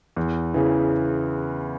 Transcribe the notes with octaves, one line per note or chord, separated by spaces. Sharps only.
E2
C#3 E3